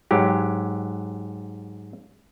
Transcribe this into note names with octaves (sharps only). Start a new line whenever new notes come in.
G#2 F#3 G4